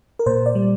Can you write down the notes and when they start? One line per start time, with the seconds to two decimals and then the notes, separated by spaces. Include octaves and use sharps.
0.19 A#4
0.26 A#2 C5
0.46 D5
0.55 G3